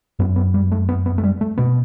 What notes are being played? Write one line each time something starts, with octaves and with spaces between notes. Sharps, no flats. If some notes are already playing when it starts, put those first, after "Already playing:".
F#2 B3
B3
G3
A3
B3
B3
A3
G3
A3
B2 B3